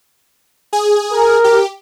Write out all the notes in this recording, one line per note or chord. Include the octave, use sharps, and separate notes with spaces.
G#4
A#4
G4